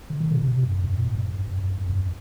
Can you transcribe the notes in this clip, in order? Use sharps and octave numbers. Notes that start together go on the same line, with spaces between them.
D3
D#3
C3
B2
C3
C3
F#2
F2
F#2
A#2
A2
G2
G2
F#2
F#2
G2
F2
F#2